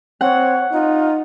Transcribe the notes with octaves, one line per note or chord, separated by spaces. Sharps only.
C4 C#5 F#5
D#4 F4